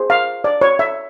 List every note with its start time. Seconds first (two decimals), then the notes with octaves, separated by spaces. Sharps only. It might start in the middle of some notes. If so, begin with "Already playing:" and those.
Already playing: G#4 C5
0.10 F5
0.44 D5
0.61 C#5
0.79 E5